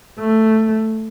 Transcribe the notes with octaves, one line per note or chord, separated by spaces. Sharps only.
A3